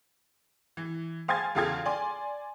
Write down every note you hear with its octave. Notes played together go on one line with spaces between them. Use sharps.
E3
C5 F5 G#5 C6 G#6 A6
E2 C#3 F4 A4 F5 G#6
D5 G#5 C6